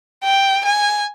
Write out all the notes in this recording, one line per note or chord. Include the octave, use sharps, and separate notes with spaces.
G5
G#5